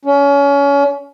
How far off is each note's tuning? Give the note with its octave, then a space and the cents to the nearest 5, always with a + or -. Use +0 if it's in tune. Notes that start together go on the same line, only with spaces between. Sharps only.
C#4 +30